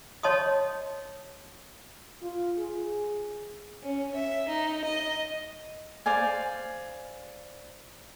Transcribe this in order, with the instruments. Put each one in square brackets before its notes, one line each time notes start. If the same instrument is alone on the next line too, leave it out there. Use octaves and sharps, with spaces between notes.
[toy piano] C#5 D#5 A5 C6 C#6 D#6
[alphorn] F4
G#4
[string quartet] C#4
E5
D#4
D#5
[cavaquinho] C5 D5 F5 G#5